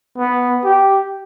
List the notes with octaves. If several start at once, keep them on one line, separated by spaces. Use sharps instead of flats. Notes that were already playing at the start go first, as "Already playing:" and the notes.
B3
G4